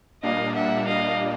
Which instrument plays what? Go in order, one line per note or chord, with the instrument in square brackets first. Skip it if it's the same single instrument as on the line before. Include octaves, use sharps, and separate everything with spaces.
[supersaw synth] A#2 G3 A#3 D4 [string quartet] D#5 F5
[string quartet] E5 F#5
D#5 F5